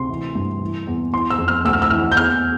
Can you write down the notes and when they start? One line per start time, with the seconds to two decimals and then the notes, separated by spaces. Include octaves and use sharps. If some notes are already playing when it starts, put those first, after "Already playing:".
Already playing: D2 C3 C6
0.09 E3
0.35 G2
0.61 E3
0.87 E2
1.12 E3 C6
1.30 E6
1.39 F2
1.48 F6
1.64 D2 E6
1.73 F6
1.82 E6
1.90 E3 F6
2.12 G6
2.16 E2 F6